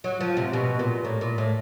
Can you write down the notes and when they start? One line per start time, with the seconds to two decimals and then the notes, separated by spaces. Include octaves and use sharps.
0.04 F#3
0.20 F3
0.37 C3
0.53 B2
0.79 A#2
1.05 A2
1.21 A#2
1.38 A2